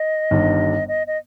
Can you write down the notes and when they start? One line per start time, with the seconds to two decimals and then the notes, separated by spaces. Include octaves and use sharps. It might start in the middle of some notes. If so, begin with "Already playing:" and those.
Already playing: D#5
0.31 G1 G2 D#3
0.88 D#5
1.07 D#5